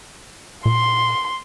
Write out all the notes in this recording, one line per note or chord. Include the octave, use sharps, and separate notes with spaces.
A#2 C6